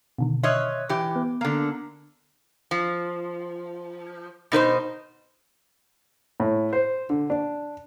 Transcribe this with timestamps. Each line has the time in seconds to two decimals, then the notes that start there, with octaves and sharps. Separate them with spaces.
0.18 B2 D3 D#3
0.43 C#5 D#5 E5 C6 F6 F#6
0.89 E3 G4
1.16 B3
1.41 D3 A#3
2.71 F3
4.52 B2 D#4 B4 C5
6.40 A2
6.73 C5
7.10 D3
7.30 D4